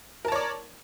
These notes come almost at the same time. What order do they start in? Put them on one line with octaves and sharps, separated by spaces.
A#4 A5 C#5 D5